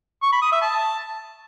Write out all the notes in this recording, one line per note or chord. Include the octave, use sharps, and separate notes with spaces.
C#6
B5
D#6
E5
A5